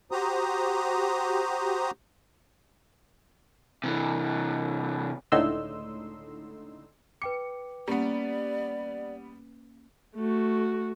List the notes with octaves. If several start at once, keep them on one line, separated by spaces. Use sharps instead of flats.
F#4 G4 C5 A#5 D#6
C3 E3
C#2 A2 D3 D#4 C6 E6
B4 G5 D6 C#7
G3 A#3 B3 C#4 D5
A3 F#4